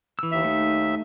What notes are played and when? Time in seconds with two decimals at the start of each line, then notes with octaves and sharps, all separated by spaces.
0.19 E3 E6
0.31 D#2 E5
0.44 A3 D#4